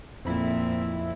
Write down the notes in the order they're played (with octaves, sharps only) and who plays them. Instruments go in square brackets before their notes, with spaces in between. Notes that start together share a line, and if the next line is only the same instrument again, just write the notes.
[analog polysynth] F2 E4 [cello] A#2 C4